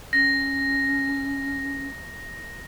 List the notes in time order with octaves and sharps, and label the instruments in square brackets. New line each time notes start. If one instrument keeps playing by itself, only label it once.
[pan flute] C#4 [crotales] A#6